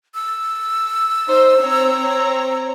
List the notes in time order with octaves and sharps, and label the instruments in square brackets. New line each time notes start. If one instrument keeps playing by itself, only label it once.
[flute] E6
[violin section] D#4 C5
C4 C#5 A#5